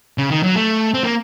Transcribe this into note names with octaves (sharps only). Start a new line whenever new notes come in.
C#3
D#3
F#3
A3
C4
A#3